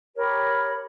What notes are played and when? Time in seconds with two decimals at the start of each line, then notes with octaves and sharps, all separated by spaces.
0.16 G4 A#4 C#5 B5